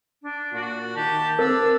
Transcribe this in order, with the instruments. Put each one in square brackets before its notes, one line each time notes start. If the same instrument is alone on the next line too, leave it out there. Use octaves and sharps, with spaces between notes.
[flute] D4
[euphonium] A#2 [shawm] F#4
[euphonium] D#3 [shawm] G4 [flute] A5
[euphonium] C4 [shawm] D4 [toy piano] A#4 [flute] E6